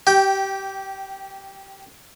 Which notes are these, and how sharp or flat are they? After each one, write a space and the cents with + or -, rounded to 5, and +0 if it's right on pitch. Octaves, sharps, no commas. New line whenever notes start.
G4 -20 G5 +0